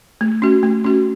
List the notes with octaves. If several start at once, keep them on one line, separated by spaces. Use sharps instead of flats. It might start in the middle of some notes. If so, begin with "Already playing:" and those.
A3
C#4 F#4
A3
C#4 F#4